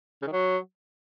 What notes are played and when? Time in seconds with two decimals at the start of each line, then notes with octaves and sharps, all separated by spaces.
0.22 C#3
0.27 D#3
0.32 F#3